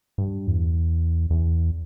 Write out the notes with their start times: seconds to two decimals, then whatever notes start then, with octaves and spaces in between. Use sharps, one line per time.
0.18 G2
0.47 E2
1.30 E2